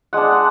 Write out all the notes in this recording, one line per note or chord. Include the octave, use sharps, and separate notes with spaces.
G#3 D4 F#5
F#5